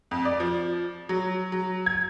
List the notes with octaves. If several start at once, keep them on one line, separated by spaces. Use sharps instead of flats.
F2
D5
F3
F#3
F#3
G#6